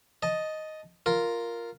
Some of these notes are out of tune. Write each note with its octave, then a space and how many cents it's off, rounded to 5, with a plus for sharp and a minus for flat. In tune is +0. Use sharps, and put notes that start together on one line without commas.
D#5 +0 A5 -5
F4 +0 A#4 +0